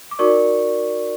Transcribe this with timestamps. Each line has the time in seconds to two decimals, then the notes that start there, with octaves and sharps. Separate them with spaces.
0.11 D6
0.19 D#4 F#4 A#4 D5 C#6